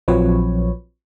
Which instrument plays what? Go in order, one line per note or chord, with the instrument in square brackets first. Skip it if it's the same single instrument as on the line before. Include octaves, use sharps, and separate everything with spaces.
[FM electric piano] A#1 F3 F#3 C4 B4 C#5